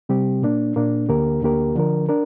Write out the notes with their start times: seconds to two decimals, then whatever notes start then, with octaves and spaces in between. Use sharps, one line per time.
0.09 C3 G3 C4 G4
0.42 A#2 A#3 D4
0.76 A#2 A#3 D4
1.09 D2 D3 A#3 G4 A#4
1.42 D2 D3 A#3 G4 A#4
1.76 D3 F3 D4 A#4
2.09 D4 A#4